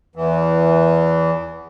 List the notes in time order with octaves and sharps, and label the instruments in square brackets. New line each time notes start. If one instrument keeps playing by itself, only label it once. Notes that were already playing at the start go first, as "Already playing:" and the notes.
[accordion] E2 E3